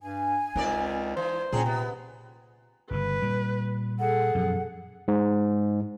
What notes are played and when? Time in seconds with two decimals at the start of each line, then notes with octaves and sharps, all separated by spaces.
0.02 G2 G#5
0.56 C#2 C3 D#4 A#4 D5
1.17 E3 C5
1.52 A#2 C#4 D4 G#4 G5 A#5
1.66 C3 B3
2.91 G1 C#3 B4
3.22 A#2 G3
4.00 G#4 A4 F#5
4.35 F#2 B2 F3
5.08 G#2